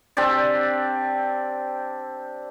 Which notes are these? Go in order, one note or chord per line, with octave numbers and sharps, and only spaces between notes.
C4 D4 G4 D5